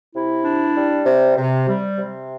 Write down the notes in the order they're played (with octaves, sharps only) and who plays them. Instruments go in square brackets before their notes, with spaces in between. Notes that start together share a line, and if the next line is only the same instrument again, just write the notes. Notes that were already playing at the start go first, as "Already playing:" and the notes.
[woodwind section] C3 E4
D4
G3
C3
C3
G3
C3